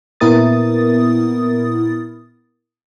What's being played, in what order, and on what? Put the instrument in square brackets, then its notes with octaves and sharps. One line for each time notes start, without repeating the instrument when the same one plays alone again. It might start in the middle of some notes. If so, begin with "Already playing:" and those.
[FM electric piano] A#2 B3 E4 A#4 D#6 A6